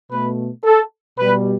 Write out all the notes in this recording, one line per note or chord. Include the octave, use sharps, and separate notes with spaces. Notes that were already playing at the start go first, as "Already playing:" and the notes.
B2 A3 B4
A4
B2 G3 B4